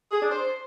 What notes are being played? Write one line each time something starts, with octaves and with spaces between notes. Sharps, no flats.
G#4
D4
C5